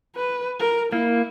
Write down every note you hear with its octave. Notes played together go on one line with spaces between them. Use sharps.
B4
A#4
A#3 E4